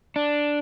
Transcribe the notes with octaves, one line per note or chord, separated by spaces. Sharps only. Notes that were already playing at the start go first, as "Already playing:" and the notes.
D4